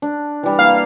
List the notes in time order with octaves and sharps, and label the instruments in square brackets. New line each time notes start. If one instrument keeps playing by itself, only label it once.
[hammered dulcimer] D4
E3 G3
[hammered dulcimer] A#3 E5 [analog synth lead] F5